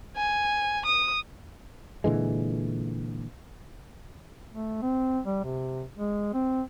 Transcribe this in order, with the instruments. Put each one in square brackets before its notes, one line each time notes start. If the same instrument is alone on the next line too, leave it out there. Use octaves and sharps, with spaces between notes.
[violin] G#5
D#6
[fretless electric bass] A#2 D3 E3 G#3
[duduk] A3
C4
G3
C3
G#3
C4